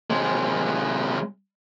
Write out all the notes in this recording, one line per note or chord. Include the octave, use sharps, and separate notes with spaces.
C3 G#3